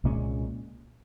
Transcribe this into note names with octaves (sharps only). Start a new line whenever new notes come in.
C2 A#2 G#3 C#4